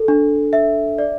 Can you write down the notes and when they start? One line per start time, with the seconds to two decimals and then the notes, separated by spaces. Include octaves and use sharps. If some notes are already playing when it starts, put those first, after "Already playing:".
Already playing: A4
0.08 D4
0.53 E5
0.98 D5